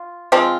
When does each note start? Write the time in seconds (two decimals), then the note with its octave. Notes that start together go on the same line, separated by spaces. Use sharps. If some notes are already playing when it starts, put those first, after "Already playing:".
Already playing: F4
0.32 F3 G#3 C4 F4